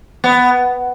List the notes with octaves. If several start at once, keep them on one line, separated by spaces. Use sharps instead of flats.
B3